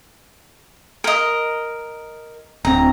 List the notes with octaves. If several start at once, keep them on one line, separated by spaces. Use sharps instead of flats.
A#4 D#5
D1 C4 A#5